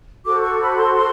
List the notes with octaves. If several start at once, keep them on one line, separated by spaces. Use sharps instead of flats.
F#4 A4 C5 D6
C#6
B5
C6
C6